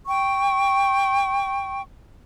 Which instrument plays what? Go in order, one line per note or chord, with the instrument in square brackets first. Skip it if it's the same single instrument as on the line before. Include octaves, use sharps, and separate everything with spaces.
[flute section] G5 C#6